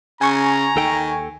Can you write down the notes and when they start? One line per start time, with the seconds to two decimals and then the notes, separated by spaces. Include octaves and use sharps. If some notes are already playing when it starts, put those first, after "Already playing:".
0.21 C#3 G#5 A#5 C#6 G#6
0.76 D#2 D#3 A4 G5